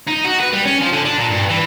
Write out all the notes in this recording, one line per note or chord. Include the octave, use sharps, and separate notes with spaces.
D#4
F#4
B4
G3
C#4
F3
D3
D4
A#2
G2
E3